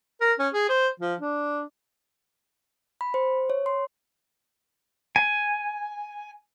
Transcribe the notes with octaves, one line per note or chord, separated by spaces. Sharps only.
A#4
C#4
G#4
C5
F3
D4
B5
C5
C#5
C6
G#5